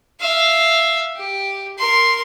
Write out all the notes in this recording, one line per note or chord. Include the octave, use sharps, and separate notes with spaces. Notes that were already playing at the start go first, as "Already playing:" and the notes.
E5 F5
G4
A#4 C6